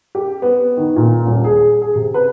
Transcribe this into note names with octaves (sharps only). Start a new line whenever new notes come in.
G4
B3
D#3
A#2
D#1
G#4
G#4
C3
B4